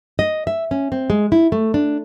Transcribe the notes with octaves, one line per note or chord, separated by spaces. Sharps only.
D#5
E5
C#4
C4
G#3
E4
A3
D4